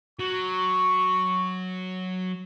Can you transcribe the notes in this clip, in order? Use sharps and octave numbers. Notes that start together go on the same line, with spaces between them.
F#3 C#6